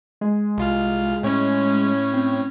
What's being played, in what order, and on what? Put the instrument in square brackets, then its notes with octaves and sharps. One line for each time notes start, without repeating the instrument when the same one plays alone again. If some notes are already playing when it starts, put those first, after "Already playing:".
[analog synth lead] G#3
[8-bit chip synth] C2 F4 F6
[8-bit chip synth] A2 C#5 [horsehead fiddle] C#4
[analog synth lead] C4